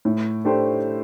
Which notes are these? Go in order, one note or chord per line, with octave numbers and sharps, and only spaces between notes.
A2
A3 D4 G4 C5